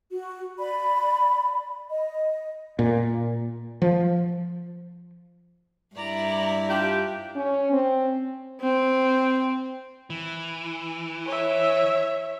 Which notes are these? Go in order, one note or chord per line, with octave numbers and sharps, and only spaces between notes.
F#4
D5 B5
D#5
A#2
F3
G2 E4 D5 A#5
D4 F4 G4
C#4
C4
C4
E3
C#5 E5